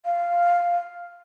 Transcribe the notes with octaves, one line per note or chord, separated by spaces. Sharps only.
F5